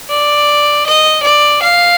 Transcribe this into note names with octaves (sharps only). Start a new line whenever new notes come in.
D5
D#5
D5
F5